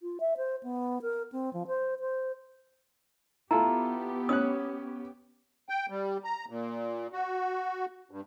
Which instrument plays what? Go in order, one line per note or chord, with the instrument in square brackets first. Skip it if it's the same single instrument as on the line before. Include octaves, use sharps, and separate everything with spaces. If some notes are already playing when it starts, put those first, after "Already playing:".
[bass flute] F4
E5
C5
B3
A#4
C4
F3
C5
C5
[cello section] B3 G4 [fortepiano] E4 F4 A4 [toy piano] A#5
[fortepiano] C#4 C#5 F#6 [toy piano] D#6
[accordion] G5
G3
A#5
A#2
F#4
G2